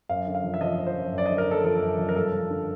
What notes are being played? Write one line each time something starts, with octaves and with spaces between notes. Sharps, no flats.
F#2 F5
D3
F5
F3
E5
F3 D#5
F3
C5
F#2
F#2
D5
D3 D#5
A#4
F#2 A4
F3 A4
F#2
F3
A#4
G2 A4
F3
D3